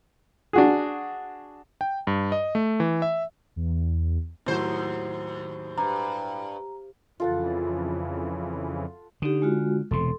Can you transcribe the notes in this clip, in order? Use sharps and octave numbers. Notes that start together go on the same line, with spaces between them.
D4 F#4 G#4
G5
G2
D#5
A3
E3
E5
E2
D#2 A2 F#3 C5
G2 A#5
F2 C#3 E3 F4 A4 F#5
D3 D#4 G4
G#3 F4 F#4
E1 C3 A4 C6